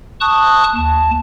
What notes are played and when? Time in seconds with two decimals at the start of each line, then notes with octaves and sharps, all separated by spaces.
0.20 A5 C#6 D#6 F#6
0.76 D#2 A5